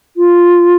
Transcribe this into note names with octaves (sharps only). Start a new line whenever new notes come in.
F4